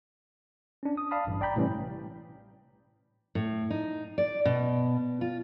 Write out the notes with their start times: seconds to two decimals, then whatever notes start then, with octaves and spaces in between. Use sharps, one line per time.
0.83 C#4 D4
0.97 D#6
1.11 D5 F5 A5 B5 D#6
1.27 A1 G2
1.41 D5 G5 A#5 B5 G6
1.56 A2 C3 E3 G3 C#4
3.35 A2
3.70 D#4
4.18 D5
4.45 B2
5.21 F4